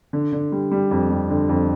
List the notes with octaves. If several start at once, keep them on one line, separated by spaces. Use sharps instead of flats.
D3
D3
G3
G3
F2
G3
D3
F2